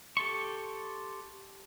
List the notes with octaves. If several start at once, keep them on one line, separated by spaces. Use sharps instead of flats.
G4 A4 C6 C#6